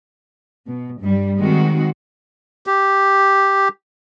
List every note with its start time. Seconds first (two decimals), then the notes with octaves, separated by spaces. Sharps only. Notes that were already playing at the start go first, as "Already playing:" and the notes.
0.68 B2
1.02 G2 G3
1.38 D#3 G#3 C4 F#4
2.67 G4